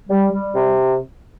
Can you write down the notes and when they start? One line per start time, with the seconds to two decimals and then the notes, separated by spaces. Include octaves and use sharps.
0.09 G3
0.32 G3
0.54 C3